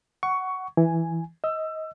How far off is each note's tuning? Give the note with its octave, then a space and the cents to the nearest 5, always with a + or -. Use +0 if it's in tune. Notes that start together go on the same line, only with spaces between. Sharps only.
F#5 +10 C#6 +15
E3 +0 G#5 +0
D#5 +25 E6 +25